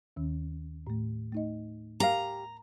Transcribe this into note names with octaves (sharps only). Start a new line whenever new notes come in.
D#2 D#3 C#4
A2 A3
A3 D#4 D#5
G4 A#4 F5 A#5